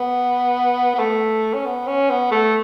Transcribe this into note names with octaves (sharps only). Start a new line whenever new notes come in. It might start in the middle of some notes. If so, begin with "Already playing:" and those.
Already playing: B3
B3
A3
C#4
B3
C#4
B3
A3